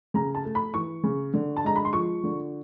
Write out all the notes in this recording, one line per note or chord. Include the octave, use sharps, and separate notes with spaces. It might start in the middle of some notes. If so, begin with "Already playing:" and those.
C#3 A#5
A5
A3
B5
E3 C#6
C#3
D3
A5
G#3 A#5
B5
C6
F3 C#6
D3